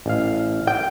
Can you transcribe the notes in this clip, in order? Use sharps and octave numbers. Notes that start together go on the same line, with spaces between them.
A1 F5
G5